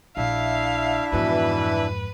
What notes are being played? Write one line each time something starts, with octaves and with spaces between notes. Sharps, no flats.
A#1 D4 E4 E5 F5
F2 G#2 B2 E3 B4